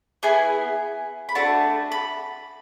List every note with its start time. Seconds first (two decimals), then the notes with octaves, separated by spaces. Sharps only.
0.23 B3 E4 G#4 G#5
1.29 B5
1.35 A3 D4 F#4 A5
1.92 B5